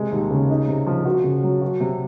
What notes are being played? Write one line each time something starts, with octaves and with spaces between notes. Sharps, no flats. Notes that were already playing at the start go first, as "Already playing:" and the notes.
Already playing: C3 G#3
D#2
C#3
D#4
C3
F3
F#4
C#3
F#3
F#4
C3